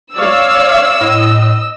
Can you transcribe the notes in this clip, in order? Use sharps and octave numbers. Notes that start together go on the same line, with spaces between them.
C#5 D5 F5 E6
A2 D#5